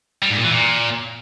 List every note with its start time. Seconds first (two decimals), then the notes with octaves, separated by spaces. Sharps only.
0.22 G3
0.30 G#2
0.37 A#2
0.44 E3
0.52 A#2